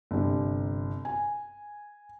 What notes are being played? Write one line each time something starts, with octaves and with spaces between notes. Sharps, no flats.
G1 C3
G#5